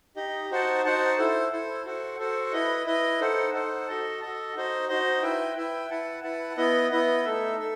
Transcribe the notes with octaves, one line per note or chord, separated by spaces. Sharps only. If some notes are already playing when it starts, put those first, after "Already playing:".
D#4 G4 D#5
D#4 F#4 C5 F#5 A5
D#4 F#4 C5 F#5 A5
E4 A4 C5
E4 A4 C5
F#4 A4 C5 F#5
F#4 A4 C5 F#5
E4 B4 D#5
E4 B4 D#5
D#4 A4 C5 F#5
D#4 A4 C5 F#5
F#4 A4 D#5 A5
F#4 A4 D#5 A5
D#4 F#4 C5 D#5
D#4 F#4 C5 D#5
E4 B4 E5 G5
E4 B4 E5 G5
E4 B4 F#5 A5
E4 B4 F#5 A5
B3 E4 B4 D#5
B3 E4 B4 D#5
A3 D#4 A4 E5
A4 E5